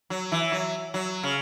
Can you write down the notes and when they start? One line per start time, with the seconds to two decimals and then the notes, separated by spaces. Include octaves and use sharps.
0.10 F#3
0.32 E3
0.52 F#3
0.94 F#3
1.23 C#3